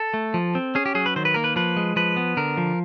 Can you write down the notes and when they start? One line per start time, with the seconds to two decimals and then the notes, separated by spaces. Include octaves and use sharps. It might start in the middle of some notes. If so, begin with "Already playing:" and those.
Already playing: A4
0.14 A3
0.34 F3
0.55 C4
0.75 C#4 G#4
0.86 G4
0.95 F#3 G#4
1.06 B4
1.16 D#3 C5
1.25 B4
1.34 A#3 A#4
1.44 B4
1.56 F3 B4
1.77 G#3
1.96 F3 B4
2.17 B3
2.37 D3 A#4
2.57 F3